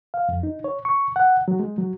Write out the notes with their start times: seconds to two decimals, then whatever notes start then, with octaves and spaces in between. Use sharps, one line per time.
0.14 F5
0.29 F2
0.43 D#4
0.64 C#5
0.85 C#6
1.16 F#5
1.48 F#3
1.60 G#3
1.78 F#3